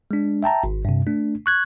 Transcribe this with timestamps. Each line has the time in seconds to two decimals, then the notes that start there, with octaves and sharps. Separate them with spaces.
0.11 G#3 D4
0.43 E5 G5 A5 A#5
0.64 G#1
0.85 G2 C3
1.07 A3 D4
1.46 C#6 F#6 G#6